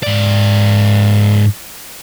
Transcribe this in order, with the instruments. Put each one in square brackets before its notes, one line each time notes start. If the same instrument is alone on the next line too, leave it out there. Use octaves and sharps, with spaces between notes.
[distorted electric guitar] G#2 D5